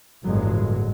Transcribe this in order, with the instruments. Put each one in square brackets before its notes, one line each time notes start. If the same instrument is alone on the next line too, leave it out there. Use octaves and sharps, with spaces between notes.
[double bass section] G1 E2 G#3 [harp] A2 F#3